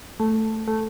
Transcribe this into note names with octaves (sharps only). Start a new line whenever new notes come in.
A3
A3